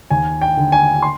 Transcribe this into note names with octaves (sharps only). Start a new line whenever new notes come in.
D#2 G#5
G5
D3
G#5
C6